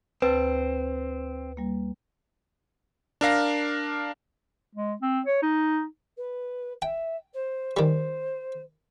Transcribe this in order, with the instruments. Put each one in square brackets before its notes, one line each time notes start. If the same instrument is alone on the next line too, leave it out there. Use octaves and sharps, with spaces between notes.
[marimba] D2 A5 A6 [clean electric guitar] C4 [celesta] B4
[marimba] G3 A#3
[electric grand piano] D4 A#4 F5 A#6
[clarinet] G#3
C4
C#5
D#4
[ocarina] B4
[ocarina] E5 [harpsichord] G5
[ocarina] C5
[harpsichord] D#3 G3 [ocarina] C5